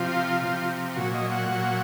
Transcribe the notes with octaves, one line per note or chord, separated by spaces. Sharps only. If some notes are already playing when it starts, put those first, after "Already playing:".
Already playing: C3 F3 F4
C3 F3
A#2 F#3 F#4
D#5
F#5
A#2 F#3